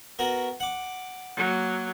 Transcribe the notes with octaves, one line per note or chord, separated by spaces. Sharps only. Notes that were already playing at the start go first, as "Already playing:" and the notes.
B3 F#4 A#4
F#5 D6
F#3 A#3